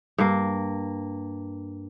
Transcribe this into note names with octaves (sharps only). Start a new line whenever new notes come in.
G2 A#3